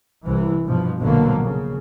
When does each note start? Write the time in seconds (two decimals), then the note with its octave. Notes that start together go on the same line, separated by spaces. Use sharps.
0.25 C2 E3
0.66 G2 B2 F3
0.99 A#1 B2 D3 F#3 A#3
1.43 C#3